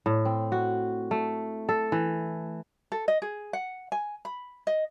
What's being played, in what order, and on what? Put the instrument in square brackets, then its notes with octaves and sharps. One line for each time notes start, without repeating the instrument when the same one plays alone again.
[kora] A2
C4
F#4
A3
A4
E3
[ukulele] A4
D#5
G#4
F#5
G#5
B5
D#5